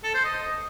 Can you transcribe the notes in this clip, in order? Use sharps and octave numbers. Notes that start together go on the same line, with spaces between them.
A4
C5
D#5